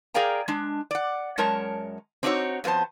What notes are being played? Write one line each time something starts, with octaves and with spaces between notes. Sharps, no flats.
G#4 A#4 D5 F5 G5 A#5
G#3 D4
D5 F#5
F#2 G#3 A#4 C#5 A5
C4 D4 D#4 F4 F#4 C#5
F2 A3 B3 C5 A5